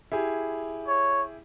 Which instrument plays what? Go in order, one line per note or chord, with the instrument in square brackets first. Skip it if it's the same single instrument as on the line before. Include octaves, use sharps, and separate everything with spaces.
[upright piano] E4 G4 G#4
[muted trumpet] C#5